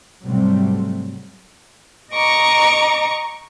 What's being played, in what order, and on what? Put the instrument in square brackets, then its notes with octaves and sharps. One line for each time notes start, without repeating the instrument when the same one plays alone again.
[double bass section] G#2 C3 F#3 G3 A3 C4
[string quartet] D#5 A#5 C#6 D6